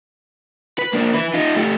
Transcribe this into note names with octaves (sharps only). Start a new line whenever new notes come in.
B4
A#3 D4
E3 B4
D#4 F4
A3 G4